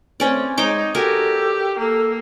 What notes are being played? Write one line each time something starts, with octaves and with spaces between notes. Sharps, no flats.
A3 C4 C#4 D5
G#3 D#4 C#5 G5 D6
F#4 G4 A4 A#4 G#5
A#3 A4